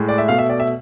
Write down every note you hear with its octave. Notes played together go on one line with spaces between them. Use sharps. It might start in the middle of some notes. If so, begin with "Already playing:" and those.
Already playing: A2 G#3
D5
E5
B2 A3 F5
E5
D5
E5